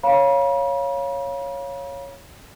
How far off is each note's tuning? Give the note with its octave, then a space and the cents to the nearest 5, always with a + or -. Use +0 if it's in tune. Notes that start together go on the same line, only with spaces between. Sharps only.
C#5 +0 F5 +0 B5 -45